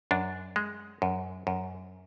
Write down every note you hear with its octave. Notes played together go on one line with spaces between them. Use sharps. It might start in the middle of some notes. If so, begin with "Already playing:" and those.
F#2 D4
G#3
F#2
F#2